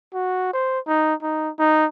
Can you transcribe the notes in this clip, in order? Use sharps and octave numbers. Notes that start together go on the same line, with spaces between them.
F#4
C5
D#4
D#4
D#4